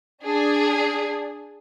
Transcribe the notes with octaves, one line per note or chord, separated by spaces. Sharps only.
D4 G#4